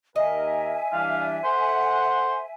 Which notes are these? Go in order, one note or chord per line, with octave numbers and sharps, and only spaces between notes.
D#2 A#4 D#5 E5 G#5
E3 G3 D4 F5
A4 C5 F#5